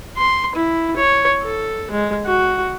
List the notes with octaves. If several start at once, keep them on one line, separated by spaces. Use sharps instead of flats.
C6
E4
C#5
A4
G#3
F#4